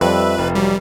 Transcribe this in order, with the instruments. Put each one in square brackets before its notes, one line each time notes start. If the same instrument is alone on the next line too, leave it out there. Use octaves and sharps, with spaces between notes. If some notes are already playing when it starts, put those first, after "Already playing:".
[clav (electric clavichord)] F2 [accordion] G3 E5 E6 [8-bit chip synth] B4
[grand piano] F1
[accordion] F#3 [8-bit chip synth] G3